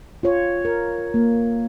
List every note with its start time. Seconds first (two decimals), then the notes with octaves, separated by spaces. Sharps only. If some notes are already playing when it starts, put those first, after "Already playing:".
0.23 F4 C#5
0.65 A#4
1.14 A#3